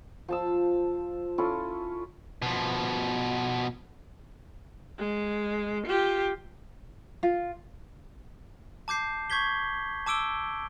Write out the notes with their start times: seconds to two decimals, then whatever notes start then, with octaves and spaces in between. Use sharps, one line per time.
0.28 F3 A5 E6
1.38 C#4 E4 F4 A4
2.42 B2 F3
4.99 G#3
5.87 F4 G4
7.23 F4
8.88 A5 D6 G6 C7
9.30 C#6 G6 G#6 B6 G7
10.06 A5 D6 E6 D7 G7